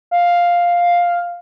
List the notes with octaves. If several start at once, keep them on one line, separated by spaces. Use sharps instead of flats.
F5